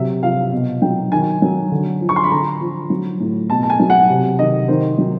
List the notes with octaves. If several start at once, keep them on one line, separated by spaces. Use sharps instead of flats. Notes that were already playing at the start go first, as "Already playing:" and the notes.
Already playing: C3 F#3 E5
F3 F5
B2
F#3 G5
D#3 G#5
F#3
D3
F3
C#6
C6
B5
D3 A#5
F3
F#3
A2
B2 A5
A5
G#5
F#3
F#5
C3
D#3 D#5
D#3 C5
F#3